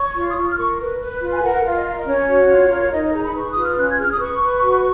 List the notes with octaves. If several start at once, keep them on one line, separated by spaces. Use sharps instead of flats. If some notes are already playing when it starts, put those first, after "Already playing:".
Already playing: C#5 C#6
F4
D#6
F4 C#6
F6
A#4 C#6
B4
B4
F4
G#5
A#4 F#5
F#5
F4 F5
D#5
A#4 F5
D#5
C#4 C#5
F#4
F4
A#4
D#4 D#5
D#5
G#4 A#5
B5
B4 C#6
D#6
F4
F6
C#4 F#6
G#6
G#4 F6
D#6
B4 C#6
B4
F#4